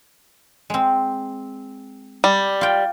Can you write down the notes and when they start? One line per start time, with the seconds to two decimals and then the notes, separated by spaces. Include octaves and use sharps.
0.70 G#3 C4
2.24 G3
2.61 F4 G5